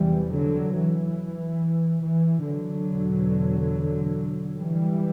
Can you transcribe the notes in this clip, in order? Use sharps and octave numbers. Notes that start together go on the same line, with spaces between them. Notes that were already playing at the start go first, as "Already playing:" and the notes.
Already playing: E2 C3 E3 G3
D3 F#3
E3
E3
D3 F#3
E2 B2
E3 G3